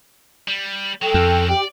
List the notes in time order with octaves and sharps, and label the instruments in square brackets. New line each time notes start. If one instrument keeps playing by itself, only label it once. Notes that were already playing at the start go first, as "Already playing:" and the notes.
[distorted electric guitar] G3
[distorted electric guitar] F#3 G#3 [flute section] A4 G5
[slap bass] F2 [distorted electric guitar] C4 C#4
[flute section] G4 G5 [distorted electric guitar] D5